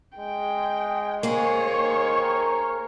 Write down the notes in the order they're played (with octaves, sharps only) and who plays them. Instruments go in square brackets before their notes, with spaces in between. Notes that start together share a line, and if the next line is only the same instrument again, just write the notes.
[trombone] G#3 [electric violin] G5
[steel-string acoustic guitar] A#3 G#4 [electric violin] C5 C#5
[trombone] D#3
A#4